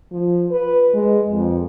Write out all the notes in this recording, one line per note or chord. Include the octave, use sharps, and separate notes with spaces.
F3
B4
G#3
F2